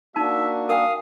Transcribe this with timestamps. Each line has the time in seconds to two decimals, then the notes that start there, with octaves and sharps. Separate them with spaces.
0.16 A#3 D4 D#4 F#4 E5 A5
0.69 A#4 F5 G5 G#5 D#6